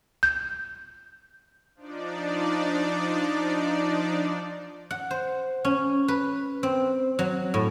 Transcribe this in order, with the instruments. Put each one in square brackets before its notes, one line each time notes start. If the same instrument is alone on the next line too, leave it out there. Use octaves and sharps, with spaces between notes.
[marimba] G6
[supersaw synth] F3 D4 D#4 D5
[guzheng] F#5
C5
C#4
B4
C4
F#3
A2